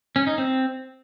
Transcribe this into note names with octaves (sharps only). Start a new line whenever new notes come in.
C#4
D#4
C4